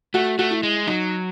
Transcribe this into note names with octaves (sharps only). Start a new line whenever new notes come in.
A3 F#4
A3 F#4
E4
G#3
F#3 D#4